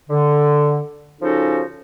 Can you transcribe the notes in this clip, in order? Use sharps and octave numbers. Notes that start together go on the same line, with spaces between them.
D3
C#3 F3 C#4 D#4 F#4 A4